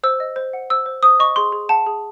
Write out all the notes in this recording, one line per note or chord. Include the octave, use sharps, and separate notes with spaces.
C5 E6
D#5
C5
F#5
C5 E6
C5
C5 D#6
D#5 C#6
G#4 C6
G#4
F#5 A5
G#4